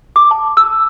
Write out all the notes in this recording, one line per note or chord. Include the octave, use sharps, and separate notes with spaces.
D6
A5
E6